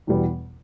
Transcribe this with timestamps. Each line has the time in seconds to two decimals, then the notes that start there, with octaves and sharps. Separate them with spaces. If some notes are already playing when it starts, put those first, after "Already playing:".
0.07 E2 B2 G3 B3